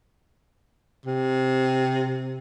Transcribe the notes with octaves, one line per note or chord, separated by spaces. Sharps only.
C3